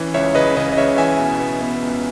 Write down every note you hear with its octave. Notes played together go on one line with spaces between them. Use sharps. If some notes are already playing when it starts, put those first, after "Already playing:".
Already playing: E3 C#4
C#2 C#5 E5
C#3 B4 D#5
C#3 B4 D#5
D#5
C#3 C#5 E5
E3 E5 G#5
B2
B3
B3
C#2